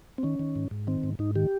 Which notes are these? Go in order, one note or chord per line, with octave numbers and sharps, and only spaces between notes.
C4
D#3 C#4
D#3
G#2
G#2
D#3 C4
G#2
G#2 D#4
D#3 G4